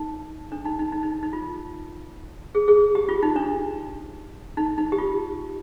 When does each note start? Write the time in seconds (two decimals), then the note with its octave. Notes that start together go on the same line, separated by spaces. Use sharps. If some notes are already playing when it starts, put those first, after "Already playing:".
Already playing: D#4
0.52 D4
0.65 D#4
0.79 D#4
0.92 D#4
1.03 D#4
1.23 D#4
1.33 F4
2.55 G#4
2.68 G#4
2.95 G4
3.09 F4
3.23 D#4
3.36 D4
4.57 D#4
4.78 D#4
4.92 G4
4.98 F4